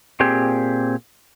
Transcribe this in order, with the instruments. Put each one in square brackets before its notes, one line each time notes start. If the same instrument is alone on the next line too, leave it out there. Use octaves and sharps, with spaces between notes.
[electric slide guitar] A#2 C4 G4 G#4